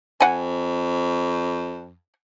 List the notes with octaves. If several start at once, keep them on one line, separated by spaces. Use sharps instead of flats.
F2 F#5 G#5